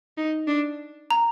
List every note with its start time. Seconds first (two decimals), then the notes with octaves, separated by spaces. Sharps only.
0.18 D#4
0.48 D4
1.11 A#5